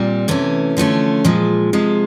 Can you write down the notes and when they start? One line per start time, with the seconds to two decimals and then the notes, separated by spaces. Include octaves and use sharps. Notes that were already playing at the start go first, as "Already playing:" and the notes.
Already playing: A#2 G3 C4
0.28 C3 E3 A3 C#4
0.77 D3 F3 A3 C#4
1.25 A#2 F3 G#3
1.73 C3 F3 G#3